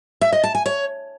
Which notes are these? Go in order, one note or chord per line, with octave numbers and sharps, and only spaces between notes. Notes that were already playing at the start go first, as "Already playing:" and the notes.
E5
D#5
A5
G#5
C#5